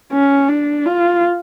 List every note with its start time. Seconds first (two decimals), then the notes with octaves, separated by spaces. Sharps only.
0.13 C#4
0.49 D4
0.86 F4